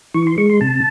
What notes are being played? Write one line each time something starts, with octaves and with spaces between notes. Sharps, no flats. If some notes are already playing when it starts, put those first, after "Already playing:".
E3 C#6
C6
G#3 C#6
C6
C3 A5